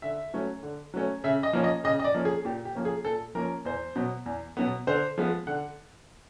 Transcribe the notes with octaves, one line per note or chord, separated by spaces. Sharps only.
D3 E5
F#3 A3 C#4
D3
F#3 A3 C#4
C#3 E5
D#5
F3 A#3 C#4
D#5
C#3 D#5
D#5
D5
F3 A#3 C#4
G#4
A#2 G4
G4
F3 A#3 C#4
G#4
A#2 A4
F3 A#3 C#4 A#4
E2 C5
B2 F#3 B3
E2
B2 F#3 B3
D3 C5
F3 G#3 B3
D3 F#5